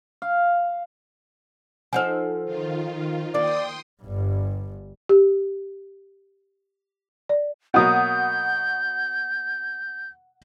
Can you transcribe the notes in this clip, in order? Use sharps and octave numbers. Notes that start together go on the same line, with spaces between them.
F5
F3 D#4 A4 C5 F#5 G#5
D#3 F4
A#3 D5 G5 C6 D#6
G1 G2
G4
D5
B2 F#3 A#3 F#5 D#6 G6